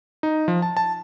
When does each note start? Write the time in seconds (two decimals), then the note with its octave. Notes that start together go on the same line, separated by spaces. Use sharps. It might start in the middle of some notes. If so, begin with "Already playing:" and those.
0.23 D#4
0.48 F3
0.62 A5
0.77 A5